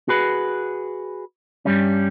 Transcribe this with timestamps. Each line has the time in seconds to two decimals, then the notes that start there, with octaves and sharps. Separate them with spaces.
0.08 F#4 G#4 B4
1.65 G2 G3 C#4